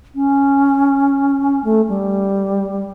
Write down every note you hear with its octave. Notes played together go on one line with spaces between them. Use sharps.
C#4
A3
G3